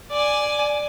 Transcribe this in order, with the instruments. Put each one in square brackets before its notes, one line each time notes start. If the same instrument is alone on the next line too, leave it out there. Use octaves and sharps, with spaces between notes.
[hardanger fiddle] D5 G#5